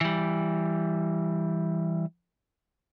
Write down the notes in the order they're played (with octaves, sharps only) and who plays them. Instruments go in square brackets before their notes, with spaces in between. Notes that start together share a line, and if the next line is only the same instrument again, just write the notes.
[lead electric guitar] E3 G3